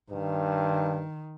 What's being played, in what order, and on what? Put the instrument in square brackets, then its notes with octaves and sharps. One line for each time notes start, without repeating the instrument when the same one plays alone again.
[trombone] G2 [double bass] D#3